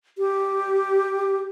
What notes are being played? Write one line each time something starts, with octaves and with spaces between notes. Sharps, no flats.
G4